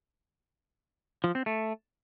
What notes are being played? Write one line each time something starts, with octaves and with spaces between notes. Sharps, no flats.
F3
C4
A3